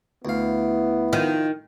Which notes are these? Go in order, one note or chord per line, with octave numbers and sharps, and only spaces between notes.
D2 B3 E4 F5
D#3 F3